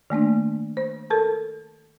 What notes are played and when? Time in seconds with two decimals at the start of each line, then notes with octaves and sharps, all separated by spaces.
0.10 D#3 A3 A#3 D4
0.77 C5
1.10 A4 A#4 A5